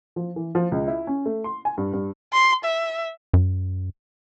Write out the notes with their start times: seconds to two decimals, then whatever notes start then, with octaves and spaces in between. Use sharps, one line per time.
0.16 F3
0.36 E3
0.55 F3
0.72 C#2
0.88 E4
1.07 C#4
1.26 A3
1.44 C6
1.65 G#5
1.78 G2
1.93 G2
2.33 C6
2.65 E5
3.33 F#2